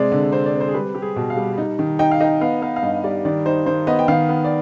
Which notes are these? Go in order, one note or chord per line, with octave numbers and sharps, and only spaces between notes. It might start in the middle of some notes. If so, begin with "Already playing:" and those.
Already playing: C3 G#3 D5
D3
C4 C5
D5
C4
C5
G#4
G3 B4
G3 G4
G#4
B2
F5
G3
D#4
D#3
D#4 G5
F5
D#4 G5
B3 F5
B3 F5
F5
G2 D#5
G3 D5
D#3 D5
D#4 C5
D#3 C5
B3 D#5
G5
D#3 F5
B3
D5